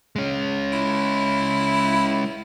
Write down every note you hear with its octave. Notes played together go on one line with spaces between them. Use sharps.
G#3 C#4
E4